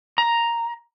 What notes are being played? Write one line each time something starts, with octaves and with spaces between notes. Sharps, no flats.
A#5